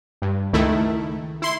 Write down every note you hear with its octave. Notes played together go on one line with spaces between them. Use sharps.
G2
C#2 D#3 A3 E4
E4 C6